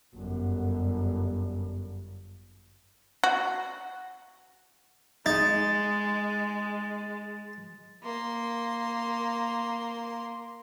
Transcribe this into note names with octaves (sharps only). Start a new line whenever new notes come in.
G1 F#2
F#4
G#3 D#4 A6
A#3 C6